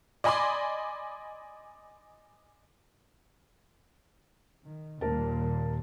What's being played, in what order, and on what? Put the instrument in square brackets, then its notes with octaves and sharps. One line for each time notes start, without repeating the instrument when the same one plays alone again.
[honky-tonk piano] D5 D#5 G#5 B5 C6 D6
[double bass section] D#3
[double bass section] D#2 A#2 G3 [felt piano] A#4 A5